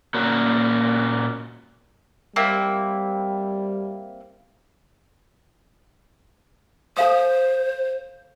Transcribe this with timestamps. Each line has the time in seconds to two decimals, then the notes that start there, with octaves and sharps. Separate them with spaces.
0.14 A#2 A#3 C#4 F#4
2.36 G3 A#3 C4 E4
6.97 A4 C5 F5 D#6